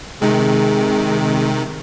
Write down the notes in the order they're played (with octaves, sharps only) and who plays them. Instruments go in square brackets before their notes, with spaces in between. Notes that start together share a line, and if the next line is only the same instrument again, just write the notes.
[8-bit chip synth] C3 D#3 [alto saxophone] G#3